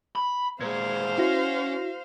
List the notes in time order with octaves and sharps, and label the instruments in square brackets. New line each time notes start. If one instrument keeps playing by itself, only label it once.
[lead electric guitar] B5
[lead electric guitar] A#2 G#3 [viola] C5 F5 [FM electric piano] G#6
[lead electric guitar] C#4 [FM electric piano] E4 F#4 A#6